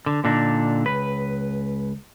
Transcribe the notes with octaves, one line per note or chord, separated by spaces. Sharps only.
D3
A#2 D3 D4 D#4
C#2 B4